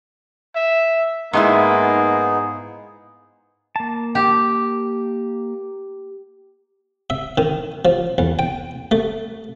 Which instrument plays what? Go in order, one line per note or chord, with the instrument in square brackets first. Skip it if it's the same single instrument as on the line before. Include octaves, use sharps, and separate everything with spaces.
[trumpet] E5
[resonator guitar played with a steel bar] G#2 G#3 E4 [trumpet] A#3 [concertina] B3 D#4 G#4
[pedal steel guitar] A#3 A5
[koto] G4
[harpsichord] E5
D#3
F3
E2
G5
A3